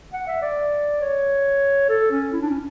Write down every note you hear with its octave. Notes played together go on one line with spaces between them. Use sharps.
F#5
E5
D5
C#5
A4
C#4
E4
D4
C#4